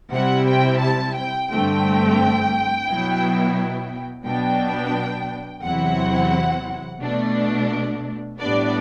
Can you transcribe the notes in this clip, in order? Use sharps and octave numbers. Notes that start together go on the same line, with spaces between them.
C3 G3 C4 E4 F#5
G5
A5
G5
G2 D3 A3 C4 G5
B2 F#3 B3 E4
B2 F#3 B3 D4 G5
E2 C3 F#3 C4 E4 F#5
B2 A3 D4
A2 G3 B3 D4 D5